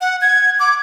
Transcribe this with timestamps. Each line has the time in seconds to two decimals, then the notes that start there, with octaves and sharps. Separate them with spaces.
0.01 F#5
0.22 G#6
0.60 D6